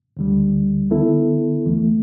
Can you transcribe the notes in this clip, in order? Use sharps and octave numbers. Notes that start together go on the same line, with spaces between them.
D2 D3 G3
D3 B3 E4 A4
E2 E3 A3